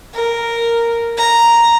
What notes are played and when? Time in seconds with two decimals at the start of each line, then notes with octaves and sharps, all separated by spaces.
0.14 A#4
1.17 A#5